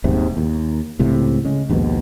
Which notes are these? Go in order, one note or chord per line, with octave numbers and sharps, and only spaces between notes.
D#1 D#2 G#2 C3
D#2
C#2 A2 C3
C#3 G#3
A#1 D#2 G#2 B2